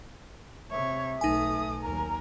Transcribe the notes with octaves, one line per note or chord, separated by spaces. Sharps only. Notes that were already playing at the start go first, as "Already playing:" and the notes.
C3 C#5 E5
B1 A3 D#4 G#5 D#6
D#2 F#3 A#4 A#5